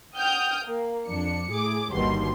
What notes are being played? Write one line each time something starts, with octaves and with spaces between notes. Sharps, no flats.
F#5 G5 D#6 F6 G6
A#3
F2 D4 C#7
A2 G#4 D6
G1 D#2 B2 D#3 G3 C6